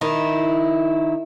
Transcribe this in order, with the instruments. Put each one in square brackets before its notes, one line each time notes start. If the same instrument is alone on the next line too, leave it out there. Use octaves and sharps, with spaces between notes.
[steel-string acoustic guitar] D#3 D#4 E4